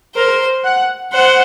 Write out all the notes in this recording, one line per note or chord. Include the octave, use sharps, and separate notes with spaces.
A#4 C5
F#5
C5 F#5